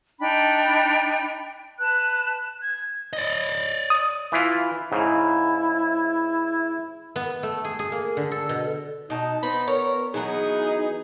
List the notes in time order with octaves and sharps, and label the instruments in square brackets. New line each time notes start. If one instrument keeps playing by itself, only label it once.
[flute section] D4 D#4 G5 B5
B4 A5 F#6
G#6
[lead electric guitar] D5 D#5
[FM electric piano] D#6
[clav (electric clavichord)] E3 E4 F4
[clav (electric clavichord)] G#2 C#3 [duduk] E4
[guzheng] B3
A3
G#4
G#4
A#3
D3
A4
B2
[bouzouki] B2 A5 [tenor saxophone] D#4
[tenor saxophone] B3 [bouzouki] C4 D#4 [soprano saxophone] B5
[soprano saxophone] A#4 [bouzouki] C#5
[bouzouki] E3 F#3 B3 [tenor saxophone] D#4 [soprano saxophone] G#4